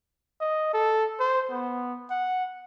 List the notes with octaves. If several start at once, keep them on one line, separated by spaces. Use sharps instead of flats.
D#5
A4
C5
B3
F#5